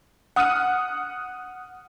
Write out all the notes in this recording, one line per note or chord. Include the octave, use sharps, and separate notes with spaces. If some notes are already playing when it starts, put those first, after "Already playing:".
F#5 D#6 F6 F#6 C#7 D#7